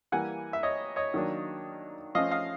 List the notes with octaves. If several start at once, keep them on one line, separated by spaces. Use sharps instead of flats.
E3 G3 A#3 F#5 G#5
E5
C#5 D#5
C#5 D#5
D#3 F#3 A#3 D4
F3 A3 C#4 D#5 F5
D#5 F5